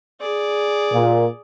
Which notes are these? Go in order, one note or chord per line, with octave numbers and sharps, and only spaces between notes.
G#4 D5
A#2